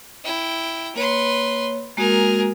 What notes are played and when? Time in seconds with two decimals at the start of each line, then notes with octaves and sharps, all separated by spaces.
0.24 E4 G5
0.95 A#3 B4 C#5 C6
1.97 G#3 A#3 F#4 G#4 A#4